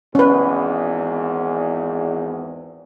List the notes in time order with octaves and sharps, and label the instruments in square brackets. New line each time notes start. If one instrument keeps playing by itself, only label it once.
[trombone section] G#1 E2 [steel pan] C#4 B4